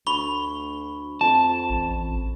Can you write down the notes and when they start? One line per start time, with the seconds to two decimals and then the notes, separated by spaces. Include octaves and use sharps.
0.07 D2 B5 C#6 G7
1.21 F2 A5
1.70 A1